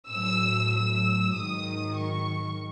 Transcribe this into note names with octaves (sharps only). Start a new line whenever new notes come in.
A2 F#3 E6
E6
G#2 D#3 F#3 D#6
C#6